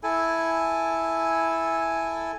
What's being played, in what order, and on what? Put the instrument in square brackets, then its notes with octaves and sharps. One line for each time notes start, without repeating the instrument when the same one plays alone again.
[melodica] E4 A4 G#5